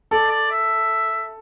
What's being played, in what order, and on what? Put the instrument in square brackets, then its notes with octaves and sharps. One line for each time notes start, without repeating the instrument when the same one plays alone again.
[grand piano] A4 [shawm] D5
[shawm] D5
E5